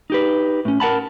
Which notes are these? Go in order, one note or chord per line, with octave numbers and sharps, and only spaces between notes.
D#4 G4 B4
A2 C#4
A#4 F#5 A5 B5